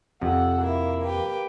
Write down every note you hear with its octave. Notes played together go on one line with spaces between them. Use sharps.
F2 C3 A4 F#5
A#3 E4
G4 B4